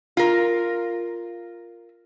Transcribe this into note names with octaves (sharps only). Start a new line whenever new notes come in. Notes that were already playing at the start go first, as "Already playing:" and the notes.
F4 A#4